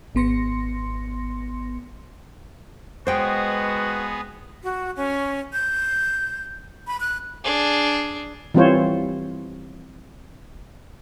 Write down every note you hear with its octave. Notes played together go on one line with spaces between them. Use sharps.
G#1 B3 C6 A#6 C#7
B2 G#3 B3 F#4 G#4 C5 G5
F#4
C#4
G6
B5
F#6
D4 G#4
E3 G3 C4 F4 C5 C#5